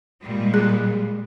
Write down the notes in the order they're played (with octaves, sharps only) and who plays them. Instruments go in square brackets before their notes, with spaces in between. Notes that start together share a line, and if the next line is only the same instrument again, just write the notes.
[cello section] A#2 G3 G#3
[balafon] G#4